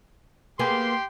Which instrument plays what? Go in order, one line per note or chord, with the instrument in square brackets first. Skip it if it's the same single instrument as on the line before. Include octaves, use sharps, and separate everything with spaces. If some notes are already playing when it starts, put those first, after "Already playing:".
[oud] A#3 B3 G#4 [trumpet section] G4 G5 C6